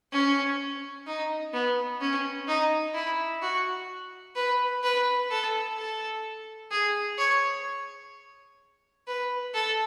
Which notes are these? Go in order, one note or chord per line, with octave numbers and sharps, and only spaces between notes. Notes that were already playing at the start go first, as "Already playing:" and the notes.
C#4
D#4
B3
C#4
D#4
E4
F#4
B4
B4
A4
A4
G#4
C#5
B4
A4